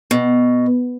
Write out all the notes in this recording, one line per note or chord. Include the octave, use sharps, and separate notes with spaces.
B2